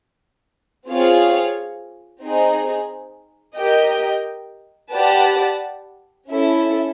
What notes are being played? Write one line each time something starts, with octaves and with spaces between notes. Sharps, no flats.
C4 F4 G#4 C#5 F5
C4 D#4 G#4
G4 A#4 D#5 G5
G4 B4 D5 F#5 A5
C#4 E4 A4